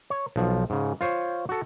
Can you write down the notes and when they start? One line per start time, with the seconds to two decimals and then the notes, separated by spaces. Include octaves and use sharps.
0.10 C#5
0.36 B1 F3
0.70 G#2 C#3
1.01 F4 C5 C#5
1.49 F#4 A4